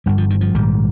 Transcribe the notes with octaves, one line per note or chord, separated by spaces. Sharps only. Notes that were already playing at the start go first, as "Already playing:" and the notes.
G1 G2 G3
F3
D#3
F3
A#1 G#2 D#3 G3